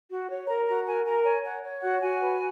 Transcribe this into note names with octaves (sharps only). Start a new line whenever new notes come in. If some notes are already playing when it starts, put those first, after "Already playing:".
F#4
C#5
A#4 A#5
F#4 A#5
A#4 G#5
A#4 A#5
C#5 G#5
C#5 F#5
C#5
F#4 F#5
F#4 G#5
B4